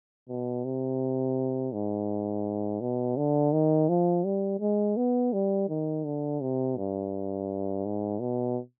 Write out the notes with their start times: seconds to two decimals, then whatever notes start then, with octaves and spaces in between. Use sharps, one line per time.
0.29 B2
0.65 C3
1.73 G#2
2.81 B2
3.17 D3
3.52 D#3
3.89 F3
4.25 G3
4.60 G#3
4.97 B3
5.33 G3
5.69 D#3
6.05 D3
6.41 C3
6.77 G2
7.85 G#2
8.21 B2